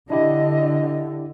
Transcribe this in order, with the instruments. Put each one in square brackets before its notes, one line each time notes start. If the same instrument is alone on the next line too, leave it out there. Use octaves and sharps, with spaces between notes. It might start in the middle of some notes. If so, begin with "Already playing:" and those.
[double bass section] D3 [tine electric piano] D4 E4 G4 [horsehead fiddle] D#5